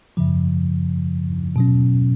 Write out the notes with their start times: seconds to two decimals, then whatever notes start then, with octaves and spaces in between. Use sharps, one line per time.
0.17 F#2 C#3 F3
1.56 B2 F#3 C#4